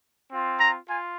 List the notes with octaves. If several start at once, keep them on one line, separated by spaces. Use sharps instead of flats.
C4 F4
A#5
F4 G#5